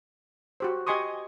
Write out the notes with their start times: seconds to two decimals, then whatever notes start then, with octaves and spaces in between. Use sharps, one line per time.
0.60 F#4 G4 C5
0.87 G4 D#5 G#5 C6 C#6 D#6